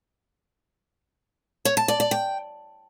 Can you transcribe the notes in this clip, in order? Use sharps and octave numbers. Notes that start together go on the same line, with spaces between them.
C#5
A5
D5
D5
G5